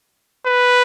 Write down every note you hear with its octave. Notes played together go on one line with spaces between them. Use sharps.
B4